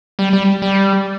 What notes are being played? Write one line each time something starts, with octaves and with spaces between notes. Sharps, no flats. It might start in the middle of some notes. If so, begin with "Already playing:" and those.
G3
G3
G3